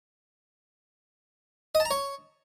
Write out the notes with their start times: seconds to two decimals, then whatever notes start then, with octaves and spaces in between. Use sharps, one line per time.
1.75 D#5
1.80 A5
1.85 A#5
1.91 C#5